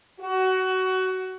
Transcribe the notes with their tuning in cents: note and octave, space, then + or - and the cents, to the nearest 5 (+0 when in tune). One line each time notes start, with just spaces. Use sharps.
F#4 +20